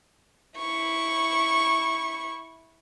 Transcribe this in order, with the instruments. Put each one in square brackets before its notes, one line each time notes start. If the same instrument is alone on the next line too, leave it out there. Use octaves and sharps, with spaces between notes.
[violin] E4 C#6